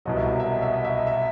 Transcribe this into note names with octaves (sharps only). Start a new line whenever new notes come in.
C2 B2 F#3 D#5
E5
D#5
E5
D#5
E5
D#5
E5
D#5
E5